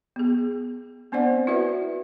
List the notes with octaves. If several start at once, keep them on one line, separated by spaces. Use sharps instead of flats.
B3 G#4
B3 C4 D4 C5 D5 F#5
E4 F#4 B4 D5 E5